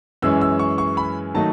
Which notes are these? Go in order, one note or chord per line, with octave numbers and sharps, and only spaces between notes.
F#2 E3 G#3 C#4 E6
E6
C#6
C#6
B5
D#3 F#3 A3 D#4 A5